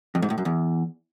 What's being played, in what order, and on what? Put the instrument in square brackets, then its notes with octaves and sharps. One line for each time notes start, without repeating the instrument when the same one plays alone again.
[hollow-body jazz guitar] F2
G#2
A2
F#2
E2